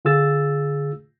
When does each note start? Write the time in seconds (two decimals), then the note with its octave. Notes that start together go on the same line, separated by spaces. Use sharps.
0.05 D3 F4 G#4 E6 A6